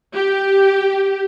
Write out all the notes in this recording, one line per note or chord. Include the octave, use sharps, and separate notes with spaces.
G4